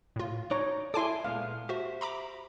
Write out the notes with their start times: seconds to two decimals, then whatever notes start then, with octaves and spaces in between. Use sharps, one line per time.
0.16 A2 F4
0.51 D#4 C#5 D5 A#5
0.94 E4 A4 D5 E5 G#5 C6 D6
1.25 A#2 G#3 B3 F5
1.69 F#4 G4 C5 E5
2.01 A#5 B5 D6